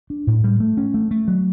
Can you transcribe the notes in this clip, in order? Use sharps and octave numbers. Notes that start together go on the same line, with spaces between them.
D4
A2
G3
A3
C#4
A3
A3
F#3